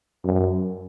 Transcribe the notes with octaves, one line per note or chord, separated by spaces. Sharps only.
F#2